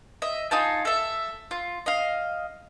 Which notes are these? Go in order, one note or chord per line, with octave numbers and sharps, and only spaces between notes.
D#5 E5
D#4 F4 G#5 A5
A4 E5
F4
D#5 F5